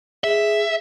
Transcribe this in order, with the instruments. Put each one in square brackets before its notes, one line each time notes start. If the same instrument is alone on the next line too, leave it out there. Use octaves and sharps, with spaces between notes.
[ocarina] G#4 [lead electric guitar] E5